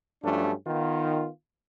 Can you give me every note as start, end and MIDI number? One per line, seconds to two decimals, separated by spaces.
0.24 0.51 43
0.24 0.51 53
0.24 0.51 54
0.24 0.51 57
0.24 0.51 61
0.24 0.51 62
0.67 1.28 51
0.67 1.28 59
0.67 1.28 65